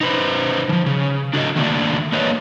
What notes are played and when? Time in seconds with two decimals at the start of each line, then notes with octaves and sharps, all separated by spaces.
0.01 D#4 B4 C5
0.69 E3 F3
0.86 C#3
1.33 D4 F#4 A4 C5 D#5
1.56 D#3 A3 A#3 D4
2.12 A#3 D4 B4 C#5 D#5